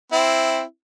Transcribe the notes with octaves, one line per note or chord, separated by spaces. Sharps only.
C4 E4